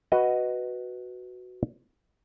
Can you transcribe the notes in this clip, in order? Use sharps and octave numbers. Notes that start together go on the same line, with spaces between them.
F#4 B4 D#5